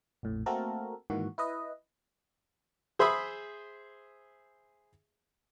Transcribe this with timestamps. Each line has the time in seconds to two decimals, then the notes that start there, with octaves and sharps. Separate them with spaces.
0.23 A#1 F2 A2
0.46 A3 A#3 C4 F#4 A4 A#4
1.10 G#2 D#3 E3 A#3 F#4
1.38 E4 B4 D#5
2.99 G#4 C5 E5 B5 D#6